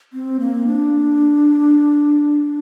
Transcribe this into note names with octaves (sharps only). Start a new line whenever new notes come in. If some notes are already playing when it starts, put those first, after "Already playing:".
C4
A#3
D4